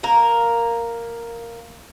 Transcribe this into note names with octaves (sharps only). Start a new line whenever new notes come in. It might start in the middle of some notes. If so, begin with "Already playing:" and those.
A#3 A#4